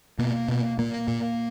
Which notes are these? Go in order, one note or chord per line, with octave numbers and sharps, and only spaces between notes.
B2 A#3
B2
A#2 A#3
A#2